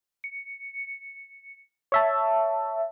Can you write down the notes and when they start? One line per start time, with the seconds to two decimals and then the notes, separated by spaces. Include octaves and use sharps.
0.24 C#7
1.92 C#5 E5 A5